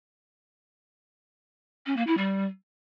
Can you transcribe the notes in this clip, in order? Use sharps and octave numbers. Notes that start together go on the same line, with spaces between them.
C#4
A#3
E4
G3